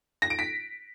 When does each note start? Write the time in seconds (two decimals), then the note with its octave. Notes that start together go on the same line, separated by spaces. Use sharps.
0.22 A#6
0.30 D7
0.39 B6